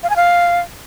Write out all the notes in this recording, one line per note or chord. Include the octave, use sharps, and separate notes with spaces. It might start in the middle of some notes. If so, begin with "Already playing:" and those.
F5
G#5
F5